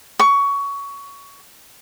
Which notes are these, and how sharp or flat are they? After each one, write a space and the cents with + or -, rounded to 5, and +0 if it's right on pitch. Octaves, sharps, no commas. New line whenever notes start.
C#6 +20